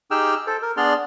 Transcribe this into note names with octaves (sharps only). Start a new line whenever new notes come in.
D#4 G4 G#4 G5 E6 F6
A4 C5
A#4
B3 D4 G#4 D5 C6 F6